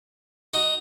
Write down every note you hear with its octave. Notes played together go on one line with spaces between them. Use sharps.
D#4 F#4